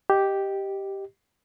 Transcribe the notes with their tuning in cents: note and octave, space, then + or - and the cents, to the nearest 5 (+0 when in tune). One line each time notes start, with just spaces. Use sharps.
G4 -5 D#5 +0